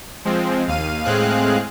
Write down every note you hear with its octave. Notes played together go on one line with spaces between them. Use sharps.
F3 G#3 C4
D#2 F5 D#7
A2 G#3 C4 G#4 F5 F#6